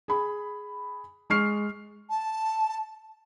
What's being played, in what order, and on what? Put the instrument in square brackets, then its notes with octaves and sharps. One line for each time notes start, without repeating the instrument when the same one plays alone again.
[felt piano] G#4 B5
G#3 C#6 F6 C7
[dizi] A5